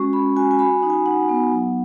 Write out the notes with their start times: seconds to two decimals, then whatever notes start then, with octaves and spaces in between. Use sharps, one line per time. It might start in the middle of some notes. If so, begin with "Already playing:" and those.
Already playing: G#3 C#4 F#4 C#6
0.13 C#4 B5
0.36 F#4 G#5
0.51 G#5
0.59 F#4 B5
0.83 D#4
0.90 G#5
1.06 D#4 F#5
1.29 B3
1.52 F#3